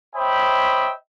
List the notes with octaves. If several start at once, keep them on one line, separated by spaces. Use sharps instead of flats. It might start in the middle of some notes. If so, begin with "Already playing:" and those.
C5 C#5 D#5 E5 G5 B5